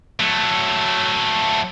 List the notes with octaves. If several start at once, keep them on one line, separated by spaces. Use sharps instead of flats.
F#3 A3